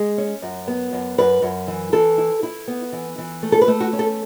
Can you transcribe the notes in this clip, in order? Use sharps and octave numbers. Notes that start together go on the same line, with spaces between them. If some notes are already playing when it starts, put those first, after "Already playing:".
Already playing: G#3
C#4
F#2
B3
F#2
F#2 B4
F#2
E3
E3 A4
E4
E4
B3
E3
E3
A3
A4
B4
A3
F#4
C#4
A4